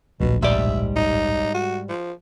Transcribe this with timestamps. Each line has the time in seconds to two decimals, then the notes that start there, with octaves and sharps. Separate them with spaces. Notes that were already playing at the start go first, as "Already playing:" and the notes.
0.20 D1 A#1 B2
0.42 G#2 G3 D5 E5
0.96 D#4
1.54 F#4
1.89 F3